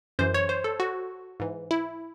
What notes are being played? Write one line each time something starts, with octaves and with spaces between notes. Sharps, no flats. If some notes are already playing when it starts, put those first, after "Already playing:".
F#2 E3 C5
C#5
C5
A4
F#4
G#2 E3
E4